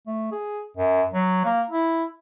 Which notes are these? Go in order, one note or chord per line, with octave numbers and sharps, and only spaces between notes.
A3
G#4
F#2
F#3
A#3
E4